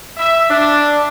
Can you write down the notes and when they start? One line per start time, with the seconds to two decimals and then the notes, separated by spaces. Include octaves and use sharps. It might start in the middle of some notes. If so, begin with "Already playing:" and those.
0.17 E5
0.49 D4